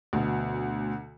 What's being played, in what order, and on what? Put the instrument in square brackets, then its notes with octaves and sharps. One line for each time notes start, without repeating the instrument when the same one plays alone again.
[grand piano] D2 B2